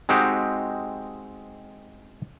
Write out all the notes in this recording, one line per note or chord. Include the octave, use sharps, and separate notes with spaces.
G#3 C4 D#4 F#4 G4